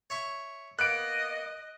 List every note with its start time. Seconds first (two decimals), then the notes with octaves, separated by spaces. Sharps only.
0.10 C#5 E5 C#6
0.79 A#3 B3 D#5 F#6 D7